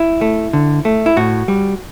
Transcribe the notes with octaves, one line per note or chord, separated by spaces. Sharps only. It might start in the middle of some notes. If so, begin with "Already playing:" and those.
Already playing: E4
A3
D3
A3
E4
A2 F#4
G3